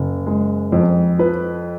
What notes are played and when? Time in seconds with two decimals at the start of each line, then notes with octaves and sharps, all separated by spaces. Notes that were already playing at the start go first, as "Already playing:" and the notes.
Already playing: F#1
0.26 G#3
0.72 F2
1.19 F3 B4